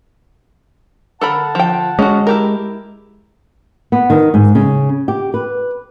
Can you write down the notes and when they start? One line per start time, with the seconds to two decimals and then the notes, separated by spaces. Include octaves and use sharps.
1.21 D3 A4 A#4 F#5 A5 B5
1.55 F3 G5
1.99 G#3 C#4 F#4
2.27 E4 G4 A#4
3.92 B3
4.10 D#3
4.34 G#2
4.55 C#3
5.08 G4
5.34 B4